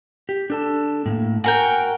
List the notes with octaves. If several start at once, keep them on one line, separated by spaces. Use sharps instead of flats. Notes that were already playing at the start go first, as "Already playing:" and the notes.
G4
D4 A4 A5
A2 G3 A#3
F#4 A#4 G5 G#5